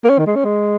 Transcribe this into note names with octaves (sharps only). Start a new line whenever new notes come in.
A#3
C#4
D#3
G#3
C#4
G#3